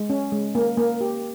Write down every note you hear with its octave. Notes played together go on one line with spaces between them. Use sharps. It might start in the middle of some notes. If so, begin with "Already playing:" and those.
Already playing: G#3
C#4
G#3
A#3
A#3
G4